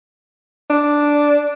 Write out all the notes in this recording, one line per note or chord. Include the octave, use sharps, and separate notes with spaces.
D4